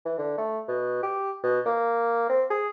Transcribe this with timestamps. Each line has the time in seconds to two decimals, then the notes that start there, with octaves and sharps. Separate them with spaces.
0.05 E3
0.18 D3
0.38 A3
0.68 B2
1.03 G4
1.43 B2
1.66 A#3
2.29 C4
2.50 G#4